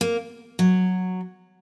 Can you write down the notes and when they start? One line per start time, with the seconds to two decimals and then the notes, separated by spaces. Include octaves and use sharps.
0.01 A#3
0.59 F#3